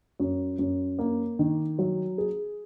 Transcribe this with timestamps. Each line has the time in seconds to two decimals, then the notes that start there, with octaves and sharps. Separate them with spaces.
0.20 F#2
0.59 F#2
0.99 A#3
1.39 D#3
1.79 F#3
2.18 G#4